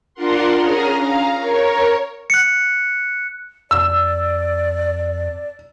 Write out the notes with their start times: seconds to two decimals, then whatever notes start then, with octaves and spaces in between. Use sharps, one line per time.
0.14 D4 F4 A#4 F#5 C6
0.56 C#4 G#4 A#5 D#6 F6
0.97 F5 A#5
1.36 A#4 C#5
2.30 F#6 C#7
3.71 F2 D5 E6